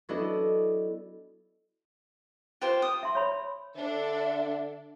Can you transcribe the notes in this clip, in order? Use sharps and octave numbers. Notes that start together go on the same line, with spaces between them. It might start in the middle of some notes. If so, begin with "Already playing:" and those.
F#3 B3 D4 E4 A4 D#5
F4 G4 C5
D#6
E5 C6
C#5 B5
D3 D4 A4 D5 E5